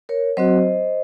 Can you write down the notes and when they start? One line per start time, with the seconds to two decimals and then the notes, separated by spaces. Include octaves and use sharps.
0.09 A#4 C#5
0.37 F#3 C4 F#4 C5 D#5